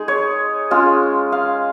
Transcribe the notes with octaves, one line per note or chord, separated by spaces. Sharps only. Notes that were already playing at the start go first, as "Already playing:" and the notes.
Already playing: G#3 D#4 G#4
C#5
G#3 C#4 F4
F5